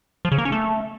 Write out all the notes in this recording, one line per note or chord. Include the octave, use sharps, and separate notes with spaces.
F3
C#3
A#3
C#4
A3